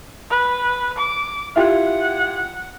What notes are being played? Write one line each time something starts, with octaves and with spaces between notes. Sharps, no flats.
B4
D6
E4 F4 G4 F#5